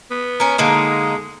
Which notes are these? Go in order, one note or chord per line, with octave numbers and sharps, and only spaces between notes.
B3
C#4 A#4
D3 G#3 A#3 D#4